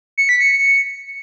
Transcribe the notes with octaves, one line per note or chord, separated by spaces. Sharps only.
C#7
B6
C#7